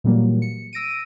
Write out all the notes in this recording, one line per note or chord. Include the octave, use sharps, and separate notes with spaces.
A#2 E3 F#3 G3 A#3
C#7
E6 A#6 D7 D#7